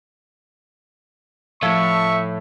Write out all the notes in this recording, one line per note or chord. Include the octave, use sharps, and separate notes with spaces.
A2 F3 E5 C#6 G#6